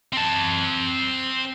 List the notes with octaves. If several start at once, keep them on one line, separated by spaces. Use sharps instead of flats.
C4 A5